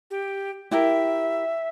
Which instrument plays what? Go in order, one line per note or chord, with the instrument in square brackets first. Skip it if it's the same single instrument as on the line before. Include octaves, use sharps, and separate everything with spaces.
[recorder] G4
[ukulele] E4 G4 A#4 [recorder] E5